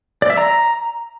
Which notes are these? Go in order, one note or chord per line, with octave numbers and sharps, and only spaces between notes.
D5
E5
A#5